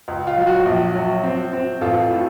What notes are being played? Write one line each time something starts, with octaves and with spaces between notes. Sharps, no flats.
C#2
F4
F#3
F#4
A#1
F#3
C4
C4
A1 F4 A4
A2